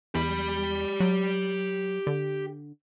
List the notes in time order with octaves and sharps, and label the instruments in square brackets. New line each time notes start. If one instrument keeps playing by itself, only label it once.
[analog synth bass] E2 [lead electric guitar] G4 B5
[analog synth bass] F#3
D3